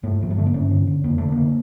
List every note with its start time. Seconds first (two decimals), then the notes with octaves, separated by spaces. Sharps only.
0.03 G2 A3
0.21 G2 F3
0.31 G3
0.37 D3 A3
0.46 A#3
0.54 G2 C#4
0.70 D3
0.87 D3
1.04 F2 A#3
1.18 D3 A3
1.32 A#3
1.37 D3